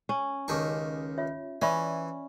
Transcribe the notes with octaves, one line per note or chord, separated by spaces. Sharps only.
C#4
C#2 D#3 D#4 G4 C#6 D6
F4 C#5 E5
E3 C#4 D5 E5 B5